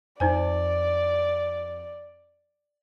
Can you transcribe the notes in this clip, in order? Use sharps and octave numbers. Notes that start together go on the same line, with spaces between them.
F2 D#4 C5 D5 G#5